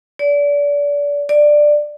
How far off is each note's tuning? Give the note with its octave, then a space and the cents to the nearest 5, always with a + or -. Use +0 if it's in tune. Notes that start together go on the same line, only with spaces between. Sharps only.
D5 -30
D5 +10